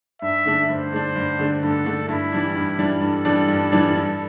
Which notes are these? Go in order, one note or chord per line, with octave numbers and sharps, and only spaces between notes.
G2 E5
D3 A3 D4
G2 C5
D3 A3 D4
G2
D3 A3 D4
G2 A4
D3 A3 D4
G2 E4
E3 G3 D4
G2
E3 G3 D4
G2 A4
E3 G3 D4
G2
E3 G3 D4
G2